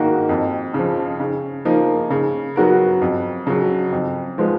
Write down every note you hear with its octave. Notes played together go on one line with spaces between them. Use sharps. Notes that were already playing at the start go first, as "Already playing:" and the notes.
Already playing: G#2 D#3 A#3 D#4 F#4
F2
C#3 F3
C#3
F3 A#3 D#4
C#3
F#3 B3 F#4 A#4
F2
C#3 F#3
F2
F3 G#3 B3